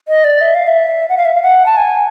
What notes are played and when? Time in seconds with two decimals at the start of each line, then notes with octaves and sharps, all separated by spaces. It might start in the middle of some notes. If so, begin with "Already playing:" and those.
0.08 D#5
0.24 D5
0.41 E5
0.55 F5
0.67 E5
1.09 F#5
1.17 F5
1.25 E5
1.35 F5
1.42 F#5
1.66 A5
1.77 G#5